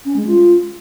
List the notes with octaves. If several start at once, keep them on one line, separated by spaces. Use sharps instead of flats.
C#4
G#3
F4